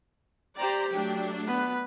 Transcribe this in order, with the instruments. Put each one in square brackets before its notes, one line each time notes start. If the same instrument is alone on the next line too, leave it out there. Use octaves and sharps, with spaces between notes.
[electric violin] G4 G5 [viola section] C5 D5 A#5
[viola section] F#3 A3 D4
[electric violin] B3 B4